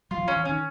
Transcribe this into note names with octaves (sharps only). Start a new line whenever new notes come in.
F#3 F4
E3
F3
C#4
E3
D#3 C#4